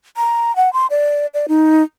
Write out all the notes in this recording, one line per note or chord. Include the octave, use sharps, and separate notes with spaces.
A#5
F#5
C6
D5
D5
D#4